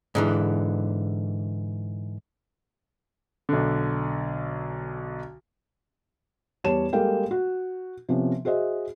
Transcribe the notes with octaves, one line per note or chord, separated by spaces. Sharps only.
G#2 D3 E3
B1 D3
E2 G3 C#5 A5 E7
G3 G#3 A#3 A4 F5 G5
F#4
C3 F3 B3 C#4
F#4 G#4 C5 D#5 E5